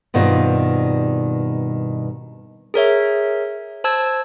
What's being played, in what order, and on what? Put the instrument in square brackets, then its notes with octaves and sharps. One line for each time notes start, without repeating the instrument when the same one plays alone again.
[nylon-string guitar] G2 B2 D#3 G3 C4 F4
[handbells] G#4 A#4 C#5 E5
C5 A5 E6 G#6